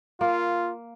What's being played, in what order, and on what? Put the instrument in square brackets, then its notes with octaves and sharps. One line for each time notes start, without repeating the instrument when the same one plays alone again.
[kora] A#3 [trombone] F4